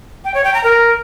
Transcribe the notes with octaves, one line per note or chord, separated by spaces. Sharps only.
G5
C#5
G5
A#5
A#4